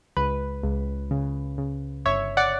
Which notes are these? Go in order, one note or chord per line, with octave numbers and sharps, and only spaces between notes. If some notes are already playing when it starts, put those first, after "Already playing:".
C#2 B4
C#2
C#3
C#3
G1 C#5 E5
D5 F#5